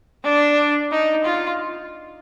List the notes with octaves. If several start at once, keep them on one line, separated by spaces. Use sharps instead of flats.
D4
D#4
F4